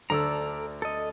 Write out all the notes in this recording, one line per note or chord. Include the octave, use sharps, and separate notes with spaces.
D2 A4 D5 A#5 D#6 E6
A4 D#5